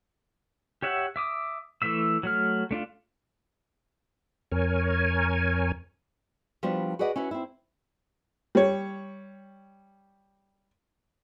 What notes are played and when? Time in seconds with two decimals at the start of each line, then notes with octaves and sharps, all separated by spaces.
0.82 G4 C#5 E5 F#5
1.16 E5 D6 D#6
1.82 E3 A3 E5 E6
2.23 F#3 A3 F6
2.71 A3 D4 F4
4.52 F2 A#4 C#5 G#5
6.63 F3 G3 B3 D4 F#4
6.99 F#4 G#4 B4 D5 D#5 F#5
7.16 C#4 E4 F#4 B4
7.31 C4 E4
8.55 G3 C#5